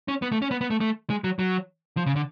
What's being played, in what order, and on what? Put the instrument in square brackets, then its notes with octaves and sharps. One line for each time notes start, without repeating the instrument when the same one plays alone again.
[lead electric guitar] C#4
B3
A3
C#4
B3
B3
A3
A3
G#3
F#3
F#3
F3
C#3
D3